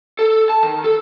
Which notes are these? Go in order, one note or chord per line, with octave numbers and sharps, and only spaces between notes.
A4
A5
D#3
A4